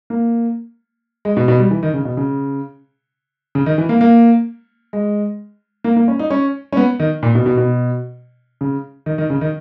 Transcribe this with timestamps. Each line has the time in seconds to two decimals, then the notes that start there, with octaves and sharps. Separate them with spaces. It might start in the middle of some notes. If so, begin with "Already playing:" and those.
0.10 A#3
1.25 G#3
1.37 B2
1.48 B2
1.59 G3
1.71 E3
1.83 D#3
1.94 C#3
2.05 B2
2.17 C#3
3.55 C#3
3.66 D#3
3.78 E3
3.89 A#3
4.01 A#3
4.93 G#3
5.84 A#3
5.96 A#3
6.08 C#4
6.19 D#4
6.30 C#4
6.72 C#4
6.77 B3
7.00 D#3
7.23 A#2
7.35 B2
7.46 B2
7.57 B2
8.61 C#3
9.06 D#3
9.18 D#3
9.30 C#3
9.41 D#3